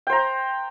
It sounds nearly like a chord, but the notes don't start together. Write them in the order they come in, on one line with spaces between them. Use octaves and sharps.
G5 C5 A#5